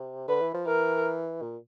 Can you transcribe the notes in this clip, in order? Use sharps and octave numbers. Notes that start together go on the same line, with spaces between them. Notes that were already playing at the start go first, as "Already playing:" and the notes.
Already playing: C3
D3 B4
E3
F3
E3 A#4
A#2